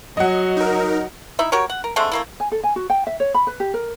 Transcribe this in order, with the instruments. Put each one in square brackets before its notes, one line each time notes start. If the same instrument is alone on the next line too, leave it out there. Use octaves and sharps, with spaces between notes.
[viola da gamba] F#3 [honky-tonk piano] D#5 F#5
[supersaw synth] D#4 A#4
[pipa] D#4 E4 E5
F#4 G4 A#4 C#5
F#5
A#4
D3 G#3 A3 C4
A3 A#3 E4
[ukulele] G#5
A4
G#5
F#4
G5
E5
C#5
B5
B4
G4
A#4